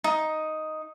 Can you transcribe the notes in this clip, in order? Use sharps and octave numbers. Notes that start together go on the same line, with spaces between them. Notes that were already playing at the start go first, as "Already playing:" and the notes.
D#4